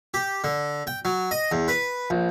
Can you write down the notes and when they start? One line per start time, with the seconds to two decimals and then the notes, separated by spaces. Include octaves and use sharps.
0.14 G4
0.44 D3
0.87 G5
1.05 F#3
1.31 D#5
1.52 E2
1.68 B4
2.10 A#1